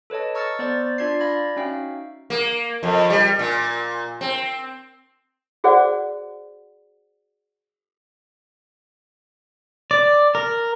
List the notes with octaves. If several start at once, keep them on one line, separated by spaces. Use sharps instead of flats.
A4 B4 C#5 D#5 A5
A#5 C#6 E6 F6 A6 C#7
B3 C5 D5 A6
D4 F4 D5 G#6 C7
D5 F5 B5 G#6 A#6
C#4 D#4 F#4 E5 F5 G5
A#3
F2
G3
A#2
C4
F#4 G#4 C5 D5 F#5
D5
A#4